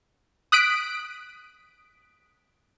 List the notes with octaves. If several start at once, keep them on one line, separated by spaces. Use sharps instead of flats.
D#6 F#6 B6 D7